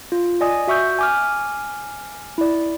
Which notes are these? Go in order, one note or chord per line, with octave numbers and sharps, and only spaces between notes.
F4
D5 D#5 G#5 D#6
F#4 E5 C#6 E6 G6
G#5 D6 F6
E4 D5